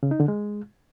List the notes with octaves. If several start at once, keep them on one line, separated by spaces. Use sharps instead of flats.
C#3
D#4
D3
G#3